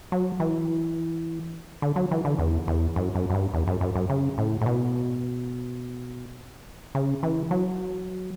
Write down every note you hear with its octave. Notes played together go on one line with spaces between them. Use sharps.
F#3
E3
D3
F#3
E3
D3
E2
E2
F#2
F#2
F#2
G2
E2
F#2
F#2
F#2
C#3
A2
A2
B2
C#3
E3
F#3